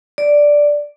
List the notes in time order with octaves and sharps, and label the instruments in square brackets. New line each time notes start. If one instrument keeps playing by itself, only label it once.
[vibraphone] D5